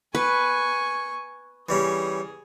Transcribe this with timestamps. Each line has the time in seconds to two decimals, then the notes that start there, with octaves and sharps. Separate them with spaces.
0.15 B4 G#5 C#6
1.69 E3 G3 C#4 G#4